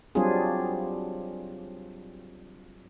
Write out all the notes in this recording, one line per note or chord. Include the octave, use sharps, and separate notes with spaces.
F#3 G3 C4 D4 F4 G#4